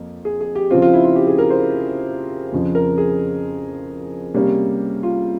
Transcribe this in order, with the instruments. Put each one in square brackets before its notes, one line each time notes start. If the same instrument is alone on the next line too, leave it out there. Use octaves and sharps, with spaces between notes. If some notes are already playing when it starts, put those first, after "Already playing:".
Already playing: [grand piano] F2 A#3
G#4
G#4
G4
C#3 F3 C4 F4
F4
E4
F4
G4
G#4
A#4
C5
F2 C#3 F3
A#4
G#4
C3 G3 A#3 C#4
F4